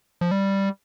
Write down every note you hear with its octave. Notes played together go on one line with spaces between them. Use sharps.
F3
G3